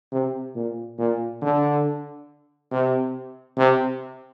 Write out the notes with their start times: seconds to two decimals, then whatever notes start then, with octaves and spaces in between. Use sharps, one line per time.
0.12 C3
0.55 A#2
0.98 A#2
1.42 D3
2.71 C3
3.57 C3